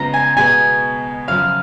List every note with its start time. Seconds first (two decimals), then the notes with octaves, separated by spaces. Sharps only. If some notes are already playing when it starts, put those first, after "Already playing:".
Already playing: C#3 G#3 B3 F4 A#5
0.14 G#5
0.37 B2 G#3 B3 G#5
1.28 F#2 C#3 F3 F5